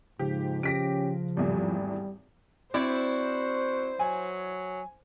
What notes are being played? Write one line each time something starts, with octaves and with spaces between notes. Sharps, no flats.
G#2 C#3 F3 G4
C#4 G4 A#6 B6 D7
G#1 E2 A2 G3
C4 E4 F#4 C5 D5
F#3 G#5